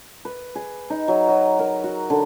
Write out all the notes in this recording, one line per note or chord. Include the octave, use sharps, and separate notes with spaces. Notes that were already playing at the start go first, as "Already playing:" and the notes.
B4
G#4
D#4
F#3
F#3
A#4
F#4
D3